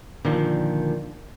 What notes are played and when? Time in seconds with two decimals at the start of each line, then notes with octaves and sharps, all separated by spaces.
0.25 A#2 D3 D#3 F3